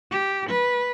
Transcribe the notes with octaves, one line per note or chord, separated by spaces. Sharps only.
G4
B4